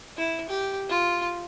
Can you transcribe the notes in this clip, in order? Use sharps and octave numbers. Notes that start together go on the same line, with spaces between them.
E4
G4
F4